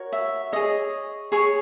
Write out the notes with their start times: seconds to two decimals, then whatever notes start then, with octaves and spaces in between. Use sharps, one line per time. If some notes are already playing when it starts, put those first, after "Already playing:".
Already playing: F#4 A#4 C#5
0.12 E5
0.52 G#4 C#5 D#5
1.32 G#4 C#5 C#6